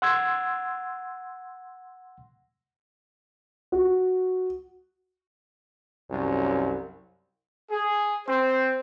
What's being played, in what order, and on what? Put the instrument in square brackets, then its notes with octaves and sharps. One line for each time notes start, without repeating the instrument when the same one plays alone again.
[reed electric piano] F#5 C6 E6 G#6
[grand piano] F#4
[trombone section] C2 F#2
[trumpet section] G#4
C4 C5